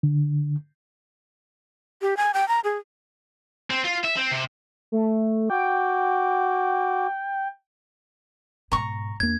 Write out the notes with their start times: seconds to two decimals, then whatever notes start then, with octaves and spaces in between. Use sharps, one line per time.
0.03 D3
2.02 G4
2.17 G#5
2.34 G5
2.48 A#5
2.64 G#4
3.70 C4
3.85 F4
4.05 E5
4.17 C4
4.32 C3
4.92 A3
5.50 F#4 G5 D6
8.72 G#2 B2 A#5 C#6
9.20 E2 A#3 D4 G#6